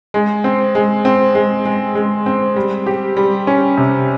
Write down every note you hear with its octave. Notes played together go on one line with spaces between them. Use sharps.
G#3
C4
G#3
C4
G#3
G#3
G#3
C4
G3
G4
G3
C#4
C3